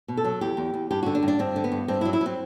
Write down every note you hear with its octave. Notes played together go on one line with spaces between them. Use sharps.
B2
A4
F#3
E2 G4
E2
E2
G2 G4
D3 F#4
D4
G2
D4
G2 C4
D3
B3
G2
G2 C4
E4
F#3
E4
F#3 C4